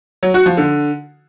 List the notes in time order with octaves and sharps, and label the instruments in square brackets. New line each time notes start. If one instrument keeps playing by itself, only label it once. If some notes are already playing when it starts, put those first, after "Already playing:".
[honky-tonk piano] F#3
F#4
F3
D3